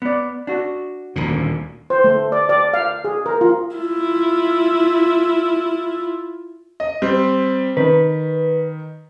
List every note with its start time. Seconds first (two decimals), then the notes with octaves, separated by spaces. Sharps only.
0.02 B3 D5
0.47 D4 F#4
1.16 D#1 D2 A#2
1.90 C5
2.04 A3
2.32 D5
2.49 D5
2.74 F5
3.04 G#4
3.26 A#4
3.41 F4
3.76 E4 F4
6.80 D#5
7.02 G3 C4
7.77 D#3 B4